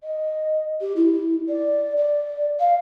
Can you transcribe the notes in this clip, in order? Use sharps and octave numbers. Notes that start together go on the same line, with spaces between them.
D#5
G4
E4
D5
D5
F5